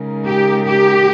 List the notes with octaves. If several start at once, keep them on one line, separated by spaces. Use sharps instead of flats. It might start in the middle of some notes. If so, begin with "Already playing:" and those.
Already playing: C#3 G#3 D#4 A#4
G4
G4